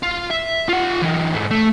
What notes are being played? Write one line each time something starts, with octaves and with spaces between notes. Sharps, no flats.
F4
E5
F4 F#5
E3 D#4
G#2 A3
A3